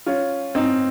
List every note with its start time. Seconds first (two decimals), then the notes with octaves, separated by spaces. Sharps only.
0.06 C#4 F4
0.55 C4 D#4